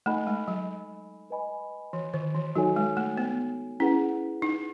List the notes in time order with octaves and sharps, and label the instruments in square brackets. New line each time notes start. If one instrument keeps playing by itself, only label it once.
[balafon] A3 [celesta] D#4 A4 D#5 G#5 B5
[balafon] G#3
F#3
[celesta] B4 D#5 G#5 B5
[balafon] E3
D#3
E3
[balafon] F#3 [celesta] D#4 F#4 A4 C#5 G#5
[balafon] G#3
A3
B3
[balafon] C#4 [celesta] E4 G#4 B4 F#5
[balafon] D#4